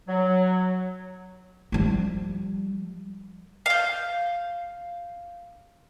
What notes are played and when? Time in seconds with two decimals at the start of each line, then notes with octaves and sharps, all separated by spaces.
0.08 F#3
1.72 F3 G3
3.66 F5 G6